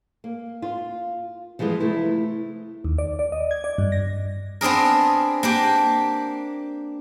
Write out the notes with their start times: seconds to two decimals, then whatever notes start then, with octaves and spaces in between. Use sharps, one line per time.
0.24 A#3
0.62 F4
1.59 E3 F3 G3 G#3 B3
1.80 C3 A3 E4
2.85 D#2
2.98 D5
3.19 D5
3.32 D#5
3.51 G#6
3.64 D5
3.78 G2
3.92 A#6
4.61 B3 C4 D4 G#4 A#4
5.43 A#3 D4 G4